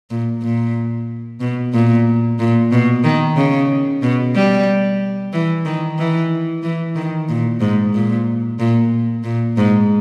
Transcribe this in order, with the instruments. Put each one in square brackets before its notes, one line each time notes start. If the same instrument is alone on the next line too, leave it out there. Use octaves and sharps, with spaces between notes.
[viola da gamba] A#2
A#2
B2
A#2
A#2
B2
D#3
C#3
B2
G3
E3
D#3
E3
E3
D#3
A#2
G#2
A#2
A#2
A#2
G#2